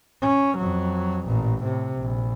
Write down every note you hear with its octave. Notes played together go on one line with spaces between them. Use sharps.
C#4
F2 F#3
A1 A#2
A2 C3
A#1